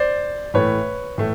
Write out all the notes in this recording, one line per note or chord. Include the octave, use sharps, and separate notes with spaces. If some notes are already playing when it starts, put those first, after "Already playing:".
Already playing: C5 D5
A2 E3 A3 B4 C#5
A2 E3 A3